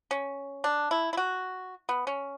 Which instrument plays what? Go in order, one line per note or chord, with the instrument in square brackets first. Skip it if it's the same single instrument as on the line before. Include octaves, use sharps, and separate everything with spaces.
[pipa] C#4
D4
E4
E4
F#4
B3
C#4